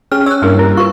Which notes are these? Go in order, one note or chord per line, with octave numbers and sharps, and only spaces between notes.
C#4 G#4 G5 F6
C#5 E6 F#6
G2 G3 A#3 D4 E4
C#4 G4 A#4
F4 B4 C#6